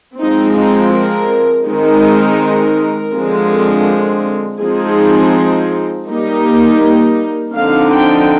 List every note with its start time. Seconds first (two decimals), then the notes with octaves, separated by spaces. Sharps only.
0.19 F3 G#3 C4 D#4
0.56 D#4
0.93 A#4
1.66 D#3 G#3 C4 D#4 A#4
3.13 D3 F3 G#3 C4
4.60 F3 G#3 C4 D#4 G#4
6.08 G3 A#3 D#4 G4
7.55 D3 F3 C4 D#4 F5
7.91 G5